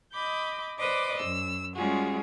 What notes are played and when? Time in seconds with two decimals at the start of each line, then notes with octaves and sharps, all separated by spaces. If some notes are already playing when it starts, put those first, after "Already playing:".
0.13 D#5 B5 D6 G6
0.79 B4 C5 D5 D#5 D6
1.20 F#2 E6
1.76 G3 G#3 C#4 F4 F#4 G#4